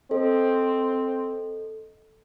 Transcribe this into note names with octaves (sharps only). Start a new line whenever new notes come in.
C4 A4 D#5